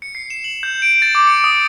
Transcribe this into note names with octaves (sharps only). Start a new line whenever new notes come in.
C#7
C7
E7
F#7
G6
D7
A6
D6
C#7
D#6